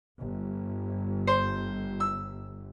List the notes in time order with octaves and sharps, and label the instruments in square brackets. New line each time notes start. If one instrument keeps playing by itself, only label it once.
[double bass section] G1
[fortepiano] C5
E6